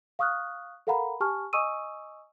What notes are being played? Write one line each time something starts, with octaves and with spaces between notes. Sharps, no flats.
F5 C#6 D#6 F6 F#6
A4 A#4 F5 F#5 A#5 B5
G4 G#5 A5 C#6 F6
D#5 G#5 C#6 D#6 E6 D#7